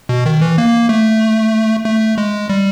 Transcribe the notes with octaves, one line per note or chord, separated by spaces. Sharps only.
B2
D#3
E3
A#3
A3
A3
G#3
G3